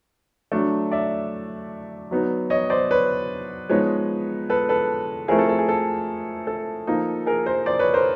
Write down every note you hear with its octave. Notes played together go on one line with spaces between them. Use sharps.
F#3 A3 D4
D5 E5
F#3 B3 D#4
C#5 D#5
C5 D5
B4 C#5
F3 G#3 B3 D#4 B4 C#5
A4 B4
A4 B4
F3 A3 C4 E4 G#4 A#4
A4
A4
G#4
A4
A4
F3 A#3 D#4
G#4 A#4
A#4 C5
C5 D5
B4 C#5
A#4 C5